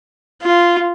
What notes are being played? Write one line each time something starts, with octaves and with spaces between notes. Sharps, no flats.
F4